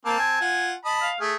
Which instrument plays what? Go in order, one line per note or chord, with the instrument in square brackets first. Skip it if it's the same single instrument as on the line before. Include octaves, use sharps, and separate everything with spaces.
[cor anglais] A#3 [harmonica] C4 A5
[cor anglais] G#5
[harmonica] F4 F#5
D#5 A5 B5
[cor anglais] F5
[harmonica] A3 [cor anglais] G#4